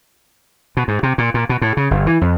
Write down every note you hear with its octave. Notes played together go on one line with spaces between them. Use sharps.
B2
G#2
C3
A#2
A#2
B2
A2
C#3
G1
E3
F2